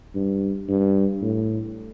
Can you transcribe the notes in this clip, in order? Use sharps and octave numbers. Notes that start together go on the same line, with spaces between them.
G2
G2
A2